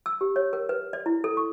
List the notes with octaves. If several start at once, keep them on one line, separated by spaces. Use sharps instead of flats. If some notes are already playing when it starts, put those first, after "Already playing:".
E6
G4
C#5
A#4
B4
D5
E4
A4
C#6